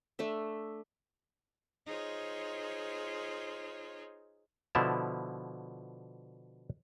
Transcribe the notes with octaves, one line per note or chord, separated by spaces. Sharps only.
A3 D4 E5
D#4 F4 G#4 C5 C#5
B2 D3 F3 E4 A5